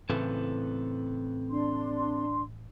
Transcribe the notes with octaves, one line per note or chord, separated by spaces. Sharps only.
A2 C#3 E3 C4 A4 B4
D4 C6